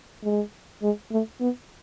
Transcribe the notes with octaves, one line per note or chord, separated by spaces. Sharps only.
G#3
G#3
A3
B3